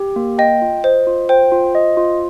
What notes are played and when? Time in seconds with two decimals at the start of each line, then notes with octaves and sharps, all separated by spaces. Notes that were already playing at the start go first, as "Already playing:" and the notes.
Already playing: G4
0.16 A#3
0.38 D#5 G5
0.62 F4
0.84 C5 D#5
1.07 F4
1.29 C5 G5
1.52 F4
1.75 D#5
1.97 F4